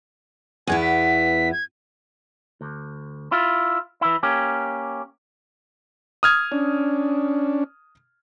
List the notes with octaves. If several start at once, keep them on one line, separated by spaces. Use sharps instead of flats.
E2 B3 E4 G#5
B6
G#6
D2
E4 F4
E3 E4
A#3 C#4 G4
D#6 F6 G#6
C#4 D4